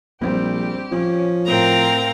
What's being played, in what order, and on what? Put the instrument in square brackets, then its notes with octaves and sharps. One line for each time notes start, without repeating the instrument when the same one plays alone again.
[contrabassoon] A#1 [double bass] G3 C4 [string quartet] G4
[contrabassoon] F3 [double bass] C#4
[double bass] A2 [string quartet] C4 A#4 G5 [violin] F5 A#5